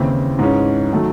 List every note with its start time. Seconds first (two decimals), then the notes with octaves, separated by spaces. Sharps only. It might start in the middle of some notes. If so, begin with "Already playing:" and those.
Already playing: D#2 C#3 E3 C4 E4
0.39 G#2 E3 G#3 C#4
0.92 D#3 F#3 A3